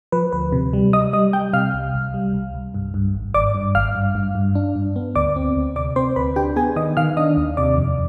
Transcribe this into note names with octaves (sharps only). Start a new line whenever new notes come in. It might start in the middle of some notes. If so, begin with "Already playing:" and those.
F3 B4
D2 B4
C3
G3
G3 D#5 D#6
G3 D#5 D#6
G3 G5 G6
C3 F5 F6
C2
C2
G3
C2
C2
G2
G2
G#1
G#1 D5 D6
G2
G#1 F5 F6
G2
G2
G2
D4
G2
B3
D2 D5 D6
C4
D2
C3 D5 D6
C4 C5 C6
D2 B4 B5
D4 G4 G5
B3 G#4 G#5
D#3 D#5 D#6
D#3 F5 F6
D4 D#5 D#6
D#2
C3 D5 D6
F2